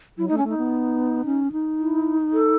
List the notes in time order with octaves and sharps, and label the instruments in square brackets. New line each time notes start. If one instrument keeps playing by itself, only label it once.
[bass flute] F#3 [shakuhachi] E4
[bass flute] A3 [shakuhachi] D#4
[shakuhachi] C#4
[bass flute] A3 [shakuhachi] D#4
[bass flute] B3
C#4
D#4
[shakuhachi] E4
A4